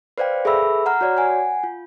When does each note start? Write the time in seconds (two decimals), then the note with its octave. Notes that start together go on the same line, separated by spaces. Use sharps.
0.18 B4 C5 D5 F5 G5
0.45 G#4 A4 B4 E5 B5 E6
0.86 F#5 A#5 F6
1.01 F#4 C#5 D5
1.17 F#5 G#5
1.63 F4